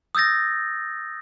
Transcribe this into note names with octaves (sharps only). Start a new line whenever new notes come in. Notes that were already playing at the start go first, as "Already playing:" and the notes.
D#6 E6 G6 A6 A#6